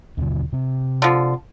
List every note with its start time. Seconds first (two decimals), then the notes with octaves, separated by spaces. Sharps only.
0.17 D#2 B2 D3
0.52 C3 C4
1.02 D3 F3